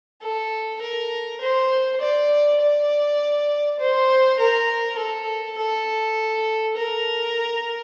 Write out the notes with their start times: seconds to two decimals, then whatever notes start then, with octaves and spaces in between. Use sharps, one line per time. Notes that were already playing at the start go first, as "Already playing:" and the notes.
0.22 A4
0.82 A#4
1.41 C5
2.01 D5
2.61 D5
3.80 C5
4.40 A#4
4.98 A4
5.58 A4
6.77 A#4